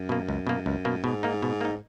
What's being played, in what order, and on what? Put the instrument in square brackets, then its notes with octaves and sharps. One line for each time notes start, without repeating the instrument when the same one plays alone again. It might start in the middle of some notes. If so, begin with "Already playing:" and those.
Already playing: [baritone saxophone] F#2
[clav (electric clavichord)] B2 A#3
C#2
B2 A#3
C#2
B2 A#3
[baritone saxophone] G#2 [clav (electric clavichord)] B2
[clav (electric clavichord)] A#3 D#4
B2
A#3 D#4